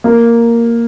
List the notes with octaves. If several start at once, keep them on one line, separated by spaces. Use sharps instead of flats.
A#3